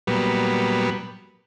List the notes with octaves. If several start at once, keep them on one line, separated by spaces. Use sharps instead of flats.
A#2 F#3 G3 B3